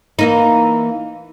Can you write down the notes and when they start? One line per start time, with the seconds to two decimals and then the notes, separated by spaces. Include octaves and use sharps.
0.19 E3 A#3 D#4